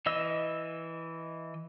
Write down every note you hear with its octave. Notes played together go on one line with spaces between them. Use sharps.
E3 D#5 E6